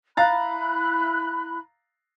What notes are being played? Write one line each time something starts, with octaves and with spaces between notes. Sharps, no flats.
E4 F5 A#5 B5 F#6 A6